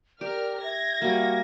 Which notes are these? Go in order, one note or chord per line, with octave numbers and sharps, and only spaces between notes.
G4 A#4 D5 F6
E5 G#6 A#6
G3 A#3 F#4